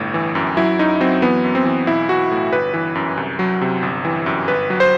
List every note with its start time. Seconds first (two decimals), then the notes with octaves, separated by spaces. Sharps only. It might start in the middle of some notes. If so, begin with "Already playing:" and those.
Already playing: G1 A2
0.14 E3
0.35 F#2
0.57 F#3 E4
0.79 F#2 D#4
1.00 F#3 C4
1.22 E3 B3
1.45 F#2
1.55 C4
1.65 E3
1.87 B1 E4
2.09 E3 F#4
2.31 A2
2.53 G1 B4
2.74 E3
2.95 F#2
3.17 C2
3.39 F#3
3.61 C3
3.82 G1
4.05 E3
4.26 F#2
4.48 G1 B4
4.70 F#3
4.80 C5